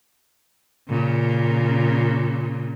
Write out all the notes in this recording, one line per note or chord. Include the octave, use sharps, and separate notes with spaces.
A#2 C#3